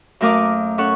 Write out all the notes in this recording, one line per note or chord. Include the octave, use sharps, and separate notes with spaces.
F#2 A3 A#4 F5 D6 D#6
C#4 A4 F#5 C#6